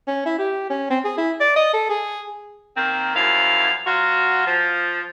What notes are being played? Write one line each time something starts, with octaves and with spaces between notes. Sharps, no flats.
C#4
E4
G4
C#4
C4
G#4
E4
D5
D#5
A4
G#4
D#3 A#3 C4
F#2 F3 E4 F5
F#3 F4 F#4
F3